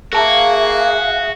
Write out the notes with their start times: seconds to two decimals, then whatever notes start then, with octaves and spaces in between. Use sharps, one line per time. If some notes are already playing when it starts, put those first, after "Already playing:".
0.13 A#3 F#4 G#4 A#4 E5 F5 A5 A#5